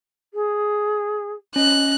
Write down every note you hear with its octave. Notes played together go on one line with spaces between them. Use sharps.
G#4
C#4 D#5 F#6